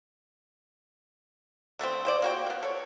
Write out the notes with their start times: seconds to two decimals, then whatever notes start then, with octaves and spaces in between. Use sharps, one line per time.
1.79 D3 A3 B3 C4
2.05 C#3 C5 D5
2.22 A#3 F#4 G5
2.46 A#3 B3
2.63 A4 C#5